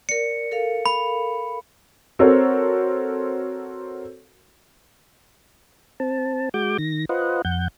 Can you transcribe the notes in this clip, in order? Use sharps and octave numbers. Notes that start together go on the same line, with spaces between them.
A#4 D5 C#7
A4 A#4 F5
B5
C4 F#4 A4 A#4 C5 C#5
C4 A5
G#3 F#4 D6 G6
D#3 A#6
F4 B4 C5 D#5 F#5
F2 F#5 G6